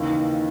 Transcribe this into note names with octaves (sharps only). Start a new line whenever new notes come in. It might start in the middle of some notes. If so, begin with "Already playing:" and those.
Already playing: D#2 C#3 E3